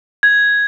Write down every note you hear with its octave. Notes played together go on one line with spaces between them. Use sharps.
G#6